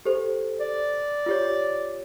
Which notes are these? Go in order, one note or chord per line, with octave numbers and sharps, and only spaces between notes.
G4 A4 C5
D5
F4 G4 C#5